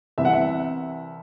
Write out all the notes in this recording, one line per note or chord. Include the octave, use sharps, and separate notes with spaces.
C2 C3 E3 E5
F#5
E5